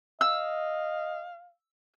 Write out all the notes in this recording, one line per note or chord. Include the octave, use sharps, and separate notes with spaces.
D#5 F5 E6